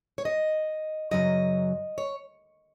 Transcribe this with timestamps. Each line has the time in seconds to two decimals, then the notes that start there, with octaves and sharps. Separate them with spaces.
0.18 C#5
0.25 D#5
1.11 F#2 C#3 F#3 D#5
1.98 C#5